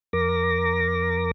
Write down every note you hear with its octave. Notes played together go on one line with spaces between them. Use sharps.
F2 A#4 D6 A#6